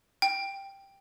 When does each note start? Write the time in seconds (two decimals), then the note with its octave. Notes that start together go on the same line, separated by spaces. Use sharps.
0.22 G5